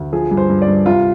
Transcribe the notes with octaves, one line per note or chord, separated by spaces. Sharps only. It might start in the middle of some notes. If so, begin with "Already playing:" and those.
Already playing: D2
F3 G#4
G2
C5
G2
D5
G2
C2 F4